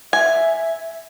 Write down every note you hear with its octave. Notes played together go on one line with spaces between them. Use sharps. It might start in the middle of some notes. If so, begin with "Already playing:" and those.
E5 G#5